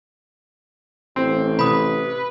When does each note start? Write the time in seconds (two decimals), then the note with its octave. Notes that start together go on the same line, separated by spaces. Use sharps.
1.16 A1 C4
1.59 C3 B4 B5 D#6